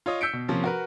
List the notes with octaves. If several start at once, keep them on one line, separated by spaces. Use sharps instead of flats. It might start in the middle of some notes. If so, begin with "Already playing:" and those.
F4 C#5 D#5 D#6
E6 G6 B6 C#7 D7
B2
C3 F3 A#3 C#4
F#4 A#4 B4